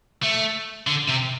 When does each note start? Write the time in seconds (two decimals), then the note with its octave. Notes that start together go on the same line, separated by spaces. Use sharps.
0.23 A3
0.87 D3
1.08 C3